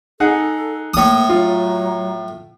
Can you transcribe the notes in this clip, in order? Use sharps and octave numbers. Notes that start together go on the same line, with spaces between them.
D#4 G#4 A4 F#5
A2 A#3 D#6
F#3 F4